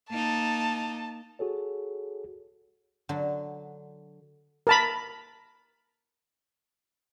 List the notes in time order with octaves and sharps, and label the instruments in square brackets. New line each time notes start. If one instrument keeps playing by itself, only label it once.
[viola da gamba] A#3 D#4 [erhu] A5
[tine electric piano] F#4 G#4 A4 C#5
[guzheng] D3 F#3
[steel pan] A#4 A5 B5